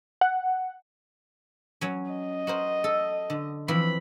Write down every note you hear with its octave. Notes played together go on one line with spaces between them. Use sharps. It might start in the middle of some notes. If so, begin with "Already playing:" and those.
F#5
F#3 C#4
D#5
F#4 A#4 C5
A4
D3
E3 F3 C4 B5